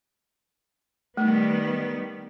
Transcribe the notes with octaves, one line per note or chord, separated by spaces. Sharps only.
D#3 G3 A3 B3